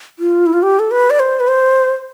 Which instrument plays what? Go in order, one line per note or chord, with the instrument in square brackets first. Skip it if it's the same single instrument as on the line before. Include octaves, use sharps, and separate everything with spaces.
[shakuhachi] F4
E4
F4
G4
A4
B4
D5
C5
B4
C5